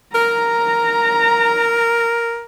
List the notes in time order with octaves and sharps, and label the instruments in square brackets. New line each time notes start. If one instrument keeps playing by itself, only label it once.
[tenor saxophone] A#4 [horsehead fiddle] A#5